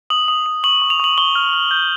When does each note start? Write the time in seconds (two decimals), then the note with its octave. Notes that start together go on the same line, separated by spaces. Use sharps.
0.10 D#6 F#7
0.28 D#6
0.46 D#6
0.64 C#6 F#7
0.82 C#6
0.90 F7
1.00 C#6 F#7
1.18 C#6 G7
1.35 F6
1.53 F6
1.71 G6